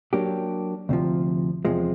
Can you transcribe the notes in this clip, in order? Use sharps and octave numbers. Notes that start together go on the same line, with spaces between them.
F#3 A#3 D4 G4
D2 C3 F3
E2 C3 F3 G#3